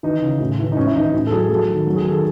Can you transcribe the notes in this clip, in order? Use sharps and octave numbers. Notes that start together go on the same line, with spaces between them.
E3 D#4
C#3
A2
E3
D#4
G#2 C#4
E4
E3 D#4
A2
A4
F#3 G#4
F#3 A4
D#3
F#3
G#4
D#3 A4